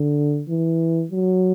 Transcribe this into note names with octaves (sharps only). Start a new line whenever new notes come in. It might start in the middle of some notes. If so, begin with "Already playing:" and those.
Already playing: D3
E3
F#3